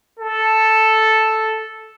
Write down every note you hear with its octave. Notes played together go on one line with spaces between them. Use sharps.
A4